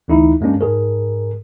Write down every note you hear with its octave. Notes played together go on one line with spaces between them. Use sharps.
D2 E3 D#4 E4
G2 G#3 A#3 C#4 D4
G#2 G#4 A#4